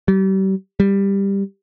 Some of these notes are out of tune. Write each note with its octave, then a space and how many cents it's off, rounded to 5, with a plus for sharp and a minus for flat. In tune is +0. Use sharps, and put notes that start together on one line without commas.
G3 -35
G3 +10